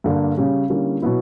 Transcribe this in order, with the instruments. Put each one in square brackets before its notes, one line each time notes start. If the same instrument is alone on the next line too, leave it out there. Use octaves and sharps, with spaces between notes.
[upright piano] G2 D3 A#3 D4
C#3 G3 C#4
D3 G3 A#3 C#4 E4
B2 F#3 B3 E4